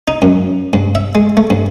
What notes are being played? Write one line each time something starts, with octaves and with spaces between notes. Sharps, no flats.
D#4
F#2
G2
E5
G#3
A3
G2